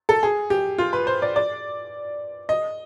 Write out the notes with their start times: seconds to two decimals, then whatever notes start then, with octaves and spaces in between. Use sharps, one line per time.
0.09 A4
0.23 G#4
0.50 G4
0.78 F4
0.93 B4
1.07 C5
1.22 D5
1.36 D5
2.49 D#5